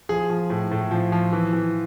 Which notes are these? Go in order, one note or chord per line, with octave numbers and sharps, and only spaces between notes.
F3 G#4
F3
A2
A2
F3
F3
E3
E3